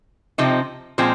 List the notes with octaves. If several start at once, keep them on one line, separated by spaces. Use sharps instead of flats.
C3 F3 C4 D#4
A#2 F3 G#3 C4